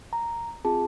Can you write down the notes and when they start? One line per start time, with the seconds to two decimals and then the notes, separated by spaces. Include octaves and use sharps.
0.13 A#5
0.65 C4 F4 G#4 A5